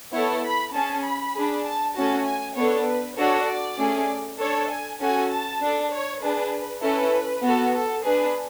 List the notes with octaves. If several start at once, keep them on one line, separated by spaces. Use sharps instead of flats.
B3 E4 A4 C#5
B5
C#4 G#4 A5
B5
D4 G#4
A5
A3 C#4 F#4 A5
G#5
B3 D4 A4 C#5
B4
D4 F#4 A4 C#5
D5
A3 C#4 G#4
D4 A4 C#5
G#5
C#4 F#4 A4 G#5
A5
D4 A4
C#5
D4 G#4 B4
C#4 E4 A4 B4
B3 F#4 A4
A4
D4 G#4 B4